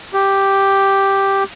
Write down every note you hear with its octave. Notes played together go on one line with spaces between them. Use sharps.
G4